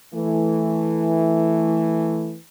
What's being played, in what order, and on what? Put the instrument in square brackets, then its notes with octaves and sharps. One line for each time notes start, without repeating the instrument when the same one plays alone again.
[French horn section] E3 A3